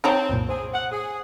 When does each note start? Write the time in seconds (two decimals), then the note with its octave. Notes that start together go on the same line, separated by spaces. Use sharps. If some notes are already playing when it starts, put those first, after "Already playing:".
0.04 C4 D#4 C#5 A5 A#5
0.29 C2 F#2 A#2
0.49 G#4 C5
0.73 F#5
0.91 G#4